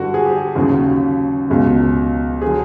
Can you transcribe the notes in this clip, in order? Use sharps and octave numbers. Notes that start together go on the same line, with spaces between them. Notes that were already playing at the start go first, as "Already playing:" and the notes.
Already playing: G2 D3 G3 F#4
G#4
G4
D#2 C#3 F#3
C#2 B2 F#3
D3 F#3 G#4